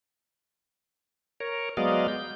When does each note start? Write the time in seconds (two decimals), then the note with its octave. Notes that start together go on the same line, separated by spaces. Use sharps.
1.40 A#4 C#5
1.77 F#3 G#3 B3 D5 D#5 F5
2.08 G6